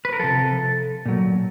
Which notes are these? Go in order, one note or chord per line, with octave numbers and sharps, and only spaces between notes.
B4
A#4
C3 F3 A4
A#2 F#3